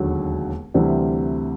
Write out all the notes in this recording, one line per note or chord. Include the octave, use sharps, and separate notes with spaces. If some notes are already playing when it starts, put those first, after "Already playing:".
Already playing: E1 D#2 D3 F#3
D2 C3 E3 G3 C4